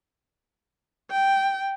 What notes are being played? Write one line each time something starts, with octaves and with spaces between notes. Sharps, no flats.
G5